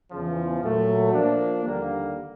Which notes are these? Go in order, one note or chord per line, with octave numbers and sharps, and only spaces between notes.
E2 C#3 F3
A#2 F#3 A3
F3 A#3 D4
D#2 D3 G3 A#3